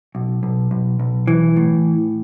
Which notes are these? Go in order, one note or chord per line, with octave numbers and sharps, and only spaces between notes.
B1
B1
B1
B1
E3
A2